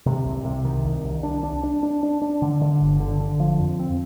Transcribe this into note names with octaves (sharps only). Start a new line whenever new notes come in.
C3
C2
C3
D#3
C2
C2
D4
D4
D4
D4
D4
D4
D3
D3
G1
D3
D3
F3
F2
C4